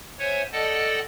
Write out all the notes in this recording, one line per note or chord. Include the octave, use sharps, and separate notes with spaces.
C5 C#5 E5 F#5 G#5
A4 D5 D#5 F#5 G5 A5